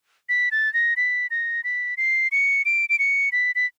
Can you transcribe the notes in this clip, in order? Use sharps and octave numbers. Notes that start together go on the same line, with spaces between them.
B6
A6
A#6
B6
A#6
B6
C7
C#7
D7
D7
C#7
B6
B6